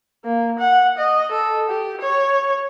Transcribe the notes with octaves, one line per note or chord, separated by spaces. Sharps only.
A#3
F#5
D#5
A4
G4
C#5